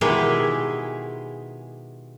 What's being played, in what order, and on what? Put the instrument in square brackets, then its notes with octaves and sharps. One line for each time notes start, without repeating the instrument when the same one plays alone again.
[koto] B2 D#3 G#3 E4 G4 G#4